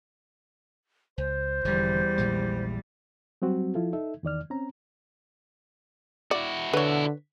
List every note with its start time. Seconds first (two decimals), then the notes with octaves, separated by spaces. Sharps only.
1.18 C#2 C5
1.65 E1 E2 D3 F3 G3
2.18 A#1 A#2 G#3
3.42 F#3 G3 C4 F#4
3.75 F3 E4 F4 A4
3.93 D#4 A4 E5
4.23 E2 D#3 D5 F6
4.50 C4 C#4 A#5
6.31 E4 F#4 D5
6.73 D3 B4 C#5